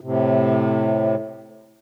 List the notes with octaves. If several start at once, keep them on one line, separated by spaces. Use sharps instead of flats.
A2 C3